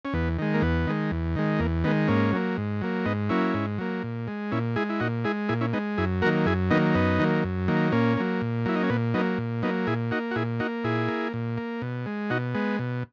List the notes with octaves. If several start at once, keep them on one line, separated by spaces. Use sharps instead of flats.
C#4
E2 B3
D#3 G#3
A#3
E2 B3
D#3 G#3
E2
D#3 G#3
E2 A#3
D#3 G#3 B3
G#2 A#3 C#4
F#3 A#3
G#2
F#3 A#3
G#2 B3 D#4
F#3 A#3 C#4 E4
G#2
F#3 A#3
A#2
G#3
A#2 C#4 E4
G#3 E4 G#4
E4
A#2 D#4 F#4
G#3 E4 G#4
A#2 E4 G#4
C#4 E4
G#3 B3 D#4
F#2 E4 G#4
D#3 F#3 A#3 F#4 A#4
F#2 E4 G#4
D#3 F#3 A#3 B3 D#4
F#2 B3 D#4
D#3 F#3 A#3
F#2
D#3 F#3 A#3
A#2 A#3 C#4
F#3 A#3
A#2
F#3 A#3 E4
D#4
C#4
A#2 B3
F#3 A#3 B3 D#4
A#2
F#3 A#3 B3 D#4
A#2 E4 G#4
A#3 D#4 F#4
F#4
A#2 E4 G#4
A#3 D#4 F#4
A#2 E4 G#4
A#3
A#2
A#3
B2
G#3
B2 D#4 F#4
G#3 B3
B2